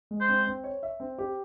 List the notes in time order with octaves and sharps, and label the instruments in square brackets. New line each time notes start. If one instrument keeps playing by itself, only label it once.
[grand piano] G#3
[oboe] C5
[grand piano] C4
C4
C#5
E5
C4
G4